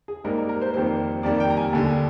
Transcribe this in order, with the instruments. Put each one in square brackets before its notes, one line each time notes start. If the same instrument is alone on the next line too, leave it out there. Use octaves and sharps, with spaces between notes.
[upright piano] G#4
G#2 G3 A#3 D#4 A#4
A#4
A#4
C5
F2 D#3 G3 A#3 C5
F2 D#3 G3 A#3 D5
G5
A#5
G#5
D#2 D3 G3